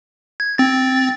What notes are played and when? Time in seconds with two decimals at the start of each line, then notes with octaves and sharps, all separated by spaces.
0.40 G#6
0.58 C4 A6